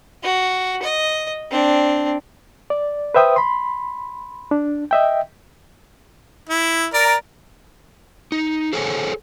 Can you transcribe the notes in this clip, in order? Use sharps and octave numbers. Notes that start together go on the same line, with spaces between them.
F#4
D#5
C4 D4
D5
B4 C5 E5 G5 D#6
B5 C6
D4
D#5 E5 G5
E4
A#4 D5 A#5
D#4
G#4 A4 C5 C#5 G#5